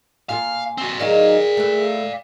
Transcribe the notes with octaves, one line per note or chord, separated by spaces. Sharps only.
A#2 F4 A#4 F5 G#5
C4 F#4
D#3 F#3 D#4 G#4 A#4 D5 F5
A3 B4